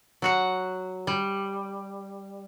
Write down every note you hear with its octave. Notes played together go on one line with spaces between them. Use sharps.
F#3 F#4 F#5
G3